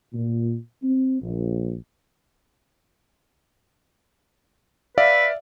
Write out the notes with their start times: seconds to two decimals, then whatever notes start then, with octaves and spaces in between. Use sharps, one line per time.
0.13 A#2
0.82 C4
1.22 A#1
4.98 B4 D5 E5 F5